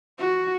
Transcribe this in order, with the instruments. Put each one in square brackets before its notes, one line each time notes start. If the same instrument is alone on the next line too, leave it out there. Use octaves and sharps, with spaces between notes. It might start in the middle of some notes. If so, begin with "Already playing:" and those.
[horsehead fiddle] F#4